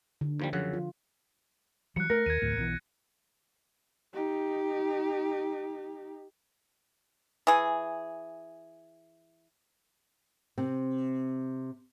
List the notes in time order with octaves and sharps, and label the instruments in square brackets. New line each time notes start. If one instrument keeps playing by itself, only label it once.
[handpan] D3
[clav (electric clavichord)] D#2 F3 G3
[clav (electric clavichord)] F#2 C#3 F#5 [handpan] F3
[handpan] F4
[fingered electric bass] E3 F#3 G3 [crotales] F#6 C#7
[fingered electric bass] A3 [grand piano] A#4 [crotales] A#6
[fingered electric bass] D#2 [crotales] G#6 D#7
[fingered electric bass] A1 D2 A2
B1 B2 E3
[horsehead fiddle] D#4 G4
[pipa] E3 G#4
[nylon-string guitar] C3 C4